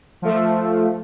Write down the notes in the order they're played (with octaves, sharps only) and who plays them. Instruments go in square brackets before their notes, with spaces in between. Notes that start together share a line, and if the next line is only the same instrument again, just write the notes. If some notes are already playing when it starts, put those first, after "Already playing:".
[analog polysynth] F3 A3